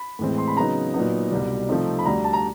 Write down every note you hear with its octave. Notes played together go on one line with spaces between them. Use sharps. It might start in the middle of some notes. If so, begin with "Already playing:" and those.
Already playing: B5
A2 E3 G#3 C4
C6
B5
C#3 F#3 B3 D#4 A#5
A#2 F#3 B3 D#4
C2 B2 G3
C3 F3 A3 C4 D#4
B5
D2 D3 G3 A#5
A5
A#5